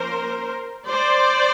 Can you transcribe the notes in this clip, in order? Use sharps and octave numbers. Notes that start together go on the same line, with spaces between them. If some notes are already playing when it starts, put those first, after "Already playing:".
Already playing: F3 A#3 C#4 A#4 C5
C5 D5